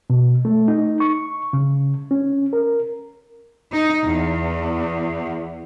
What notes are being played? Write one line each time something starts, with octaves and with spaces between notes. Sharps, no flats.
B2
A3
D#4
C#6
C#3
C#4
A#4
D#4
E2